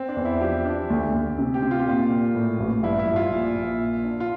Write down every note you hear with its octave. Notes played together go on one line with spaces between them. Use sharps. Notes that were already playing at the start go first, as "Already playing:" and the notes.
Already playing: C4
D4
E2
E4
F3 G4
D4
D2
D2
C3
G4
C3
F4
G4
A#2 F4
A#2
A2
A1
G2 E4
E4
G2
F4
A#1
A#1
A#2
D4
F4